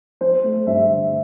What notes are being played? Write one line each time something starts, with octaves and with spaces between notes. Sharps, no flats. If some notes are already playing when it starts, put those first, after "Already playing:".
F3 C5
A3
G2 E5
D3